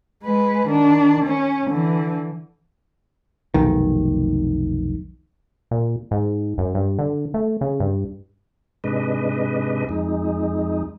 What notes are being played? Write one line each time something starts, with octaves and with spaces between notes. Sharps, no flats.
G#3 B4
D#3 D4
C#4
D3 E3
F1 B1 D#3
A#2
G#2
F#2
G2
D3
A3
C#3
G2
G#2 C3 G#3 D4 B4 D#5
F2 G#3 D#4